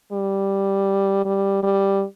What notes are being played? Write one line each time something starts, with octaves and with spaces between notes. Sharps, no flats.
G3
G3
G3